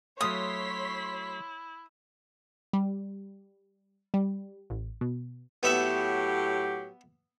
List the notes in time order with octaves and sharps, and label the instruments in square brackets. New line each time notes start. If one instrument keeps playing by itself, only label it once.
[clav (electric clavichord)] F#3 A3 F5 [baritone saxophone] E4 [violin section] C#5 C6 B6 [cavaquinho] D#6
[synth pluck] G3
G3
A1
B2
[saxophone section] A2 F#3 G4 [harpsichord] B3 E5